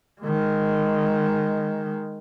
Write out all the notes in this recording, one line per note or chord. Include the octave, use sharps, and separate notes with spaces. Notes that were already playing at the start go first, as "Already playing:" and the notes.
D#3 G#3